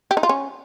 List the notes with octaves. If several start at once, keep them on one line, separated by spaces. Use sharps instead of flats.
G4
D#4
F4
C#4